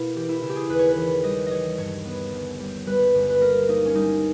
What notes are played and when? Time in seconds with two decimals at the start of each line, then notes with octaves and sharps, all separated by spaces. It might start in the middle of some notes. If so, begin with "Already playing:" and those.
Already playing: B2 A#3 E4
0.15 E3 G4
0.29 E4
0.42 C#3 E4
0.49 G4
0.56 G#4
0.69 D#2 B4
0.79 C#5
0.89 B4
0.97 E3
1.23 G3 D#5
1.46 G3 C#5 D#5
1.78 G2 C#5
2.05 B3
2.32 G1
2.60 G3
2.87 G3 B4
3.15 G1
3.30 B4
3.41 A#3 A#4
3.68 A#3 D#4
3.86 C#4
3.95 G3 D#4